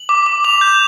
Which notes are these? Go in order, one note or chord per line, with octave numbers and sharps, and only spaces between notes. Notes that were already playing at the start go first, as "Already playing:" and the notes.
Already playing: F#7
D6
D6
D6 F7
G6